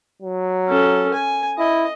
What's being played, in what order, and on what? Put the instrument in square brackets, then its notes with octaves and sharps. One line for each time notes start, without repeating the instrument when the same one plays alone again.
[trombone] F#3
[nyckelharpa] C#4 A4
G#5
[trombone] E4 [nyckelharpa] D#5